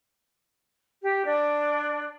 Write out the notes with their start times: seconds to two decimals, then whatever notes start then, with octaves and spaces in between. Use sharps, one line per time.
1.02 G4
1.25 D4 D5